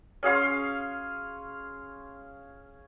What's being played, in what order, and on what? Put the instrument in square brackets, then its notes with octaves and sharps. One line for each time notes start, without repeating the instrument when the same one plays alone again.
[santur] C#4 G#4 F5 C6